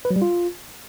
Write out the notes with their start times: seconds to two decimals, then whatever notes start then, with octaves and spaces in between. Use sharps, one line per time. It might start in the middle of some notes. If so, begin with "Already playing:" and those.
0.05 B4
0.11 F#3
0.16 G3
0.22 F4